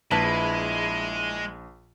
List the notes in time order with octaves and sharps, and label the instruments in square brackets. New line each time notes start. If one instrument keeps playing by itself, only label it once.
[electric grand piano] A#1 A5 [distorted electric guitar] G#3 [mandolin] E4 B4